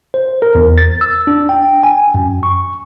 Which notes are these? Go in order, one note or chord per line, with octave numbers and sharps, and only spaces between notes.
C5
A#4
E2
A6
E6
D4
G5
G#5
F#2
C#6